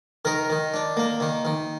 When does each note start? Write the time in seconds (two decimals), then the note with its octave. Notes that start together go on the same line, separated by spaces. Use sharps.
0.25 D#3 A#4
0.50 D#3
0.74 D4
0.97 A#3
1.20 D#3
1.45 D#3